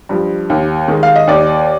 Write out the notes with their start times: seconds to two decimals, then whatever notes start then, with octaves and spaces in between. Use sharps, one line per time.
0.09 G2 F3
0.50 D#2
0.88 D#3 G#3
1.03 F5
1.16 D#5
1.27 D#2 D5